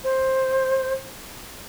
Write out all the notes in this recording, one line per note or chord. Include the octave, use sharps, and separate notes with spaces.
C5